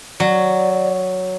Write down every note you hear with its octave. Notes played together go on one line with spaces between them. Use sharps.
F#3 D5